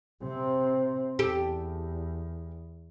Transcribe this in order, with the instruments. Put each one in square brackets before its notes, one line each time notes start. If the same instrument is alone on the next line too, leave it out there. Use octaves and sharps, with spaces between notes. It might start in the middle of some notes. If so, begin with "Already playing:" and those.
[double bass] C3 C4
[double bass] E2 [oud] G4 A4